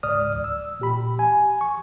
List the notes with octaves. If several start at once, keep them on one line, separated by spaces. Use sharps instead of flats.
C#2 G#2 D5 D#6 F6
E6
A#2 G4 B5
G#5
C#6